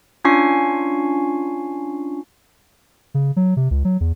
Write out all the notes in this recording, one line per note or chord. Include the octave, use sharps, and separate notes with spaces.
C#4 D4 F4 G#5 C#6 C7
C#3
F#3
C3
C#2
F#3
E2